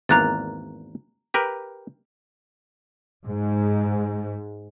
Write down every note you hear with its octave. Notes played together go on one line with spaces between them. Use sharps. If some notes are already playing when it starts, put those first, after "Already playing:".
G#1 E2 A#3 A#5 F#6 A6
G4 A#4 B4
G#2